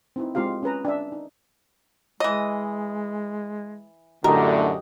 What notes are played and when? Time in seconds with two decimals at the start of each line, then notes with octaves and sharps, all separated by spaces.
0.16 C4 D#4 E4
0.35 G#3 C4 F4 G4 F5
0.63 C#4 G#4 B4 A#5
0.85 D4 E5
1.12 D#4
2.20 E3 G#3 D#5
4.24 F#2 A2 D3 A3 F#4 G4 A#4 D#5